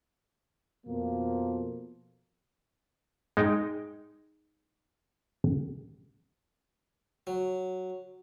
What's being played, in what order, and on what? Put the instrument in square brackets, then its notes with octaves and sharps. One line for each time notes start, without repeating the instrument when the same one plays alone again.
[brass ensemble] F2 B2 F3 A#3
[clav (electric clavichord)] G#3 D#4 G5 A#5
[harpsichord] F#3